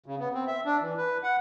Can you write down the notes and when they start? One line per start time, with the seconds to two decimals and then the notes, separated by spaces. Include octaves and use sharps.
0.06 C#3
0.19 B3
0.34 C4
0.47 E5
0.65 D4
0.81 E3
0.97 B4
1.23 F#5